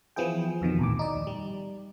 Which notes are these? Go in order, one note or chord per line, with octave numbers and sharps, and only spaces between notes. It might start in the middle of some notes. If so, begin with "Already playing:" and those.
E3 F3 B3 E4 G#4 G5
F2 B2 D#3 E3
A#1 D#2 A2 D6
D#4 D5
G3